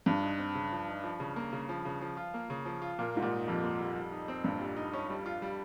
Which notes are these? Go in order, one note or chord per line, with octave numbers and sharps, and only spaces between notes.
G2 F3
D#4
C4
C#3
F3
D#4
F3
C#3
A#3
C#3
F3
C#3
F3
F4
A#3
C#3
F3
F4
A#2 A#3
G#2 G3
A#2
D#4
F2 G3
A#3
G3
G3
D#4
C4
G2 A#2
G3
D#4
C#4
G3
F4
G3